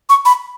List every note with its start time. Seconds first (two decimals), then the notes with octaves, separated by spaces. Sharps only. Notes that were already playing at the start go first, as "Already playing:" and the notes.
0.09 C#6
0.25 B5